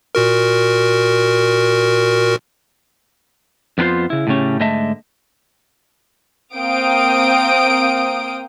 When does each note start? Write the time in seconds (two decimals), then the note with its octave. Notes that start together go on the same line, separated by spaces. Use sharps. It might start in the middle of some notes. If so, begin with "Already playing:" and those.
0.15 A#2 F#4 A#4
3.78 F2 B3 D4 F4 C5
4.10 C#3 E4
4.27 A2 C#3 A3 C#4 G4
4.60 G#2 D3 A3 D#5 E5 A5
6.54 A#3 C4 F5 G5 D#6 D7